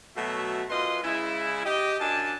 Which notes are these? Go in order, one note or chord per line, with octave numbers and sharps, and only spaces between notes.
B2 F#3 A3 F#4 E5
F#2 F4 B4 D#5 C6
C#3 G#3 E4
G4 D#5
F#2 D4 G#5 A5